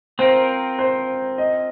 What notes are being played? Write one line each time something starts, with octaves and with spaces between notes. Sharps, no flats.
C4 F4 A#4 C5
C5
D#5